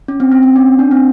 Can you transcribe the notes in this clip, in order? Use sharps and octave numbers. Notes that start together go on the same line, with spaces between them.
C#4
C4
C4
C4
C#4
D4
C4